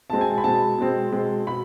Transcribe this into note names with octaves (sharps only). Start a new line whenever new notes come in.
B2 G#3 C4 A5
G#5
A5
B5
B2 G#3 C4 A5
B2 G#3 C4
B2 G#3 C4
B2 B5